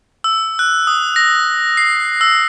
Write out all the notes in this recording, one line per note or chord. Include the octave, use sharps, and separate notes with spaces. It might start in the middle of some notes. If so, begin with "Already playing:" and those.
E6
F#6
D#6
A#6
C7
E6